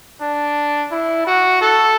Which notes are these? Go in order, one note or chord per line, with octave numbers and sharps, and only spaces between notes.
D4
E4
F#4
A4